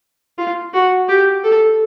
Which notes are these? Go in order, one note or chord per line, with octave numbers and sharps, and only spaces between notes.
F4
F#4
G4
A4